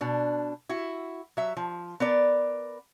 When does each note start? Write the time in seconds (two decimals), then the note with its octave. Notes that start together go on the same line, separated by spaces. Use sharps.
0.01 B2 D4
0.69 E4 F#4
1.37 F#3 E5
1.57 F3
2.00 B3 A#4 D5